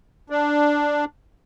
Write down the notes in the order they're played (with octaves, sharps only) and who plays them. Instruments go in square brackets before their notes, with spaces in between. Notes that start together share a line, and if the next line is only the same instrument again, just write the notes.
[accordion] D4